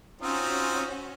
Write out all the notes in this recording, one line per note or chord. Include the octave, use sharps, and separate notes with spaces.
C4 C#4 D#4 F4 F#4